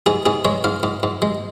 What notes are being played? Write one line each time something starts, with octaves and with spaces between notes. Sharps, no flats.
G#2 G#4
G#2 G#4
G#3 C#5
G#2 F5
G#2
G#2
G#3